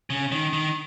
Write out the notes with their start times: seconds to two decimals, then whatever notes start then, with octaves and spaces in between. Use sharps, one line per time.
0.10 C#3
0.32 D#3
0.53 D#3